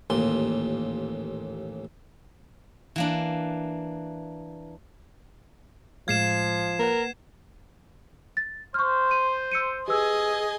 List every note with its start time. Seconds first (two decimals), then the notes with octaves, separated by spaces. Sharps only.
0.10 A1 D#2 A#2 C6
2.96 E3 A#3 D4
6.08 A2 F3 G#3 F5 G#6 C7 E7
6.79 A#3 A#4 B4 F#5
8.37 A6
8.74 C5 C#6 F6
9.11 D#7
9.52 E6 C#7 D#7
9.88 G4 G#4 B4 D#5 G#5 E6